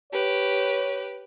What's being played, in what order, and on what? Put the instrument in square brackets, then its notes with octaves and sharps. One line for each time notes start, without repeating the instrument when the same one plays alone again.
[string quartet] G4 B4 [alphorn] C#5